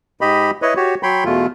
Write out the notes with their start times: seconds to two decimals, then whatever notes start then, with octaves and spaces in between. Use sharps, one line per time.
0.21 G#2 G4 D#5 B5
0.62 E4 B4 C#5 D#5
0.76 F#4 G4 C#5
1.03 F#3 C#5 G5 B5 C6
1.25 E2 B2 A3 F4